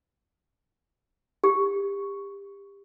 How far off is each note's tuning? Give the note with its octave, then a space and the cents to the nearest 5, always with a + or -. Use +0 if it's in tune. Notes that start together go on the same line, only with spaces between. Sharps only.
G4 +30